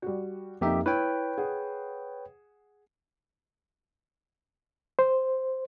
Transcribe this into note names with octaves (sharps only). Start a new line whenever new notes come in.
G3 F#4
F2 A#3 D#4 G4 E5
E4 B4 C#5 G5
G#4 F#5
C5